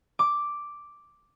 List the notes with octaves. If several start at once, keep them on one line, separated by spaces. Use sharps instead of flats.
D6